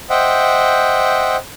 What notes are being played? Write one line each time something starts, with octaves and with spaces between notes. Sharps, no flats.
C5 D#5 E5 F#5 G5